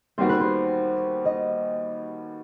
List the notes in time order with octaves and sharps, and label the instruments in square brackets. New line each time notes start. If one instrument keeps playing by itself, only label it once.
[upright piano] D#2 D#3 G3 B3 F#4 [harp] C5
[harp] B4
C5
D#5